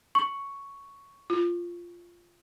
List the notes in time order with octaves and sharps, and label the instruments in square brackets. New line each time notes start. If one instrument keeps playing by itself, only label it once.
[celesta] C#6
[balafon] F4